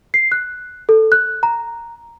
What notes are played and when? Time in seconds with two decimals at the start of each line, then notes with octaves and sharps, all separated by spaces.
0.14 C7
0.32 F#6
0.89 A4
1.12 F#6
1.43 A#5